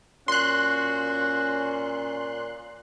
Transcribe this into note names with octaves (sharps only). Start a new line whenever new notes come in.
A#2 C#4 F#4 C6 F#6